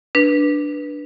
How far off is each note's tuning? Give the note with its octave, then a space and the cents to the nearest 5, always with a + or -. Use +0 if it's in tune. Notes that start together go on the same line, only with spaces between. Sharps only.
D4 +0 B4 -10